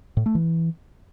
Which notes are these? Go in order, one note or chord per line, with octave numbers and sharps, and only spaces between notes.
A2
A3
E3